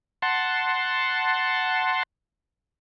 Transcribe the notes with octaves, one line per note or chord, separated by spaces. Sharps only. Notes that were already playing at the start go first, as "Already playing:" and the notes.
F#5 A5 C6